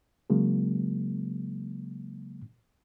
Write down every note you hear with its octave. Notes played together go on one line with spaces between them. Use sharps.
C#3 F#3 G#3 A#3